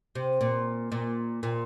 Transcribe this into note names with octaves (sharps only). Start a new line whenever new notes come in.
C3
A#2
A#2
A#2